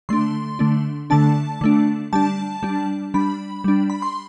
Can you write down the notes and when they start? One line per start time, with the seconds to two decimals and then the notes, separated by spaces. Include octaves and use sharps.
0.09 D3 A3 D4 C6
0.59 D3 A3 D4
1.10 D3 A3 D4 A5
1.61 D3 A3 D4
2.13 G3 D4 A5
2.63 G3 D4
3.14 G3 D4 B5
3.64 G3 D4
3.90 B5
4.02 C6